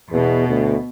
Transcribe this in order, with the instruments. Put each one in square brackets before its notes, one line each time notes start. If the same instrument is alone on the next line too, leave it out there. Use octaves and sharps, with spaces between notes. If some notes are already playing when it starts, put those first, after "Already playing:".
[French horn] E2 [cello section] B2
[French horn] D2